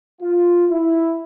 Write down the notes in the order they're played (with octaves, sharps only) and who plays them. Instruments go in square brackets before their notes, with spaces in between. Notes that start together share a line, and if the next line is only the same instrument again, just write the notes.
[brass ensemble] F4
E4